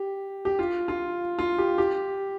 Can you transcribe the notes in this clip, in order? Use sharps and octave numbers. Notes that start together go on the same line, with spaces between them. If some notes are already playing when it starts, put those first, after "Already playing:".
Already playing: G4
G4
F4
F4
F4
G4
G4